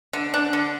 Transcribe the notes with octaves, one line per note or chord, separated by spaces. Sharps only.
D3
D4
D3